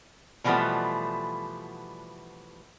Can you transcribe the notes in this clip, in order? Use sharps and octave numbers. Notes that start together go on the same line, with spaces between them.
B2 E3 F3 G3 A3 B3